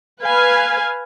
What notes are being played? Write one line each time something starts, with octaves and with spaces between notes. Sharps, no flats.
B4 F5 G#5